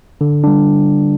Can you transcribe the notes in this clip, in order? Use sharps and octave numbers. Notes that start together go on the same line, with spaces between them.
D3
G3 D4